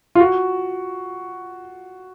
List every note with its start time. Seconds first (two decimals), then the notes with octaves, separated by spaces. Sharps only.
0.15 F4
0.20 F#4